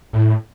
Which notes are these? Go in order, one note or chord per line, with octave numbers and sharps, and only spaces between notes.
A2